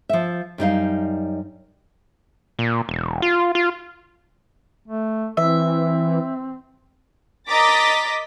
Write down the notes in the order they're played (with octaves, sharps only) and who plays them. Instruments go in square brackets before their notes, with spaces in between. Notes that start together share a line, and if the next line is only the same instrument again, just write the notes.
[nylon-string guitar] F3 E5
F#2 G3 D#4 F5
[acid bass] A#2
E1
F4
F4
[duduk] A3
[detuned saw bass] E3 [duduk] C4 [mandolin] E5
[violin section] A#4 D#5 A#5 D6 A6 B6